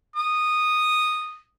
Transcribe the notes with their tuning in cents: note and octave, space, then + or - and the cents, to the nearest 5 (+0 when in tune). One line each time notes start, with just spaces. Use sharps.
D#6 -10